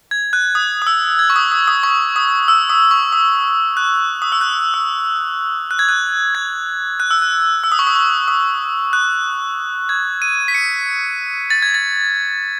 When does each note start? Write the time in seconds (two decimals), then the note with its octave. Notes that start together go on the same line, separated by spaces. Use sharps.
0.11 G#6
0.33 F#6
0.55 D#6
0.82 D#6
0.87 E6
1.19 G#6
1.30 C#6
1.36 D#6
1.52 D#6
1.68 D#6
1.83 C#6
2.16 D#6
2.48 E6
2.70 D#6
2.91 C#6
3.12 D#6
3.77 F#6
4.22 D#6
4.32 E6
4.41 F#6
4.74 E6
5.71 F#6
5.79 G#6
5.89 F#6
6.35 G#6
7.00 F#6
7.11 E6
7.22 F#6
7.64 E6
7.72 D#6
7.79 C#6
7.87 D#6
7.96 C#6
8.28 D#6
8.93 F#6
9.89 G#6
10.22 D#7
10.48 B6
10.54 C#7
11.50 A6
11.62 G#6
11.74 A6